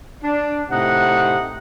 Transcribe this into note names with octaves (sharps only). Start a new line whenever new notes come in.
D4
A2 C3 D#4 F#5